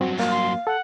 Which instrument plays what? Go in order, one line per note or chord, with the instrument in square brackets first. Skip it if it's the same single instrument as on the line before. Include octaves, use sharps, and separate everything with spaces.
[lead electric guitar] G2 F#3 [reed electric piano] C4 F#4
[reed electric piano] A#3 [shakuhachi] F5
[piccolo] C6
[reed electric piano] A4 [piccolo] F#5